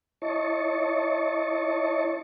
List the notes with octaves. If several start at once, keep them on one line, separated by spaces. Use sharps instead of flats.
E4 C#5 D#5 A5 C#6